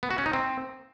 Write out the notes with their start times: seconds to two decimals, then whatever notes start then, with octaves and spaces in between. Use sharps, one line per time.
0.03 B3
0.11 F#4
0.18 C#4
0.26 D#4
0.33 C4